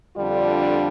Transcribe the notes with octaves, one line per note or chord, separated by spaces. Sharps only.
F2 D3 G3 D4 F4